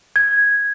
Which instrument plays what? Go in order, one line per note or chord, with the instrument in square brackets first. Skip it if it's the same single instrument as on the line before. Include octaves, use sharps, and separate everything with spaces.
[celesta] G#6